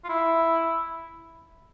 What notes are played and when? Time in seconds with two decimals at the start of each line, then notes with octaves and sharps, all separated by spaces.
0.04 F4
0.09 E4